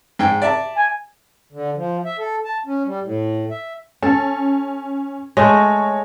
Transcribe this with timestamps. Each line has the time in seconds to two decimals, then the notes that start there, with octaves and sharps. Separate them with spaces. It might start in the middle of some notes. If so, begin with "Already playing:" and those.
0.19 G#2 G5
0.42 D5 E5 A5
0.76 G#5
1.53 D3
1.76 F3
2.05 E5
2.19 A4
2.45 A5
2.66 C#4
2.86 G3
3.03 A2
3.51 E5
4.02 C#4 A4
5.37 G#3 A3 C#5 A#6